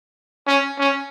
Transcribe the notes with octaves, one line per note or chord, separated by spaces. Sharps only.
C#4
C#4